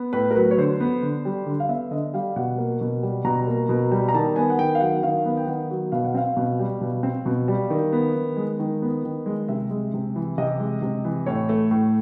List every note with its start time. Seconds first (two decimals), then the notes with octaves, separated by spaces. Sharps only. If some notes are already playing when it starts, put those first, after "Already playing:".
Already playing: B3
0.13 A2 B4
0.31 A#4
0.35 F#3 B4
0.51 C#5
0.58 D3 C5
0.80 B3
1.03 D3
1.25 G3
1.46 D3
1.60 F5
1.69 B3 E5
1.91 D3 D#5
2.14 G3 F5
2.36 B2 F#5
2.58 A#3
2.81 B2
3.03 G3
3.24 B2 A#5
3.47 A#3
3.69 B2
3.92 G3
4.09 A#5
4.14 D#3 A5
4.36 B3 G#5
4.50 F#5
4.59 D#3 G5
4.75 F5
4.81 F#3 F#5
5.03 D#3 F5
5.26 B3
5.37 G5
5.47 D#3 F#5
5.71 F#3
5.92 B2 F5
6.05 F#5
6.14 C4 F5
6.37 B2
6.59 G3
6.81 B2
7.03 C4
7.26 B2
7.48 G3
7.70 D#3
7.93 B3
8.15 D#3
8.37 G#3
8.59 D#3
8.82 B3
9.04 D#3
9.26 G#3
9.49 C3 E5
9.71 G#3
9.94 C3
10.16 E3
10.38 C3 D#5
10.60 G#3
10.82 C3
11.05 E3
11.26 A2 C#5
11.49 A3
11.71 A2